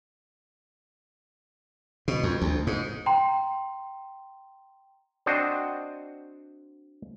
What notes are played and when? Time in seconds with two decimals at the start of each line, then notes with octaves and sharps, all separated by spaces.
2.08 B2
2.23 F2
2.42 D2
2.67 G#2
3.06 G5 A#5 C6
5.26 C4 D4 F#4 C5 D#5